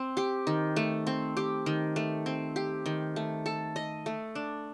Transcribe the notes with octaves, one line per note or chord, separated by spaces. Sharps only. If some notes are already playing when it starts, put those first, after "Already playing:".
Already playing: C4
G4
D#3
A3
C4
G4
D#3
A3
C4
G4
D#3
A3
A4
D#5
A3
D4